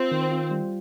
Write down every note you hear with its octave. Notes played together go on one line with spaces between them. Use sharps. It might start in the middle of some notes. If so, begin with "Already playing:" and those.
Already playing: C4 F4
D#3
F4
G3